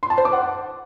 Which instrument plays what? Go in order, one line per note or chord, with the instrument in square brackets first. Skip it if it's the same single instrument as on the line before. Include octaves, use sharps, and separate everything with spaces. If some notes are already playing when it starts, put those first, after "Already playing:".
[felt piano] C6
A5
C5
D6
F#5